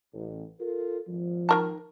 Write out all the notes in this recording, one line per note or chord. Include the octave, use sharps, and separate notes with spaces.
A1
F4 A4 A#4
G#1 F3
D#3 A#4 A5